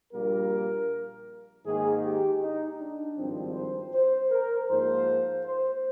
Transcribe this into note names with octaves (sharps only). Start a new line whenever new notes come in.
A#1 A#2 G3 A#3 A#4
G#2 D#3 A#3 G#4
G4
D#4
D4
G#1 G2 F3 C4
C5
C5
A#4
G#2 F3 A#3 C5
C5